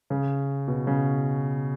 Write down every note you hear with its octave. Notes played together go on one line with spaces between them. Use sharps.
C#3
B2
C#3